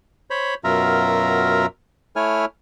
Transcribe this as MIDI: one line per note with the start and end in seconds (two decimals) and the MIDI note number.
0.30 0.54 72
0.30 0.54 73
0.30 0.54 83
0.64 1.66 42
0.64 1.66 47
0.64 1.66 65
0.64 1.66 70
0.64 1.66 76
0.64 1.66 82
2.16 2.45 57
2.16 2.45 64
2.16 2.45 73
2.16 2.45 80
2.16 2.45 89